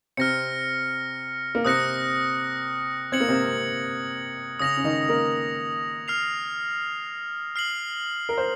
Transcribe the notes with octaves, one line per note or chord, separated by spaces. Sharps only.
C3 C4 F6 A#6 C#7
A#3
C3 C4 D#6 F#6 A#6 C#7
C4 G#6 C#7 F#7
A#3
C3 C4
C#3 C#4 D#6 A#6 F7
C#4
D#3 D#4
A#3 A#4
F6 C7 F7
F6 C7 F#7
A#4
C5